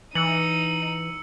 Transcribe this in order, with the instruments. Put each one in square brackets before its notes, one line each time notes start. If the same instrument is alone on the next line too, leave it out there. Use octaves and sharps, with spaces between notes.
[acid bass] E3 [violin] D#4 D#7 [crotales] E6 C#7 F#7